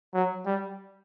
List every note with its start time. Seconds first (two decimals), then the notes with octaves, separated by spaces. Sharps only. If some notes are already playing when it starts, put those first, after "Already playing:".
0.14 F#3
0.46 G3